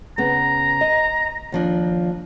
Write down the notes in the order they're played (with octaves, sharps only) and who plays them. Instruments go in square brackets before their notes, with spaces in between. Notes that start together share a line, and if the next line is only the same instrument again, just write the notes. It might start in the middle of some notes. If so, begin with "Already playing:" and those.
[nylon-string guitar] C#3 B3 [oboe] A#5
[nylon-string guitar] D#5
D#2 F3 D4